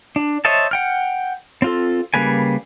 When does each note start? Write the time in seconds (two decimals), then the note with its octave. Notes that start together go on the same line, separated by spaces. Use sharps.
0.16 D4
0.45 C5 C#5 D#5 E5 A5
0.71 F#5 G5 F6
1.62 C4 F4 A4
2.14 C#3 G3 A#3 B4 G#5